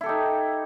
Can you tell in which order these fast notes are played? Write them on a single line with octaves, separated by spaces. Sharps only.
E4 A4 G4 D#4